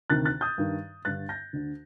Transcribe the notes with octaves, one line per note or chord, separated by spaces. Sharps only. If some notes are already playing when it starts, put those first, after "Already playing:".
D2 C3 D#3 F#6 A6
F#6 A6
D#6 G6
G2 D#3
G2 D3 F#6 A6
G6 A#6
D2 D3